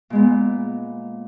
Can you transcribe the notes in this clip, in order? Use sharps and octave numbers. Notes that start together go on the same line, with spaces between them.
A#2 G#3 B3